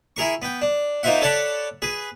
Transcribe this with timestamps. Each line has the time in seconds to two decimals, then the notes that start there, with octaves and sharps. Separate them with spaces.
0.16 E4 G#4 A#4 C#6
0.42 B3 G5
0.61 D4
1.03 A#3 D#4 F4 C5 E5 F#5
1.21 A4 C#5 D5 F#5 A5 B5
1.82 G#4 B4